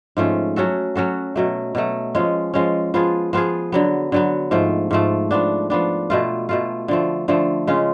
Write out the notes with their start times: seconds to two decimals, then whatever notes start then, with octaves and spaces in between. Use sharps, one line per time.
0.17 G#2 F3 A3 C#4
0.56 F#3 C#4 F#4 A4
0.96 F#3 C#4 F#4 A4
1.36 B2 F#3 A3
1.75 B2 F#3 A3
2.15 F3 G#3 C#4
2.54 F3 G#3 C#4
2.94 F3 B3 F4 G#4
3.33 F3 B3 F4 G#4
3.72 D3 F#3 B3
4.12 D3 F#3 B3
4.51 G#2 F3 A3
4.91 G#2 F3 A3
5.31 F3 B3 D4
5.70 F3 B3 D4
6.10 B2 A3 F4
6.49 B2 A3 F4
6.88 D3 F3 A3
7.28 D3 F3 A3
7.67 C#3 G#3 C#4 F4